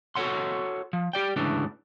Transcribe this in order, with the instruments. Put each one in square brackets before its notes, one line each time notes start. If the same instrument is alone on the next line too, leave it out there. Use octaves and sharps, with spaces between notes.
[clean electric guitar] F#4 A4 B4 C#5 F#5 C6
F3
G4 D5 G5
D2 G#2 C#3 E3 D4